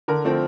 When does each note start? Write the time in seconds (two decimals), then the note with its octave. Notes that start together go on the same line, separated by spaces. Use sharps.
0.08 D3 A#4
0.24 F3 A3 C4